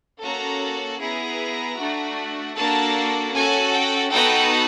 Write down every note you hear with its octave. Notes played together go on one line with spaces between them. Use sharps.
A#3 C#4 F#4 A4 A#5
B3 E4 G#4 A#5
A3 D4 F#4
A#3 D4 F#4 A4 A5
C#4 F#4 A4 G#5
G5
B3 D#4 F#4 A4 G5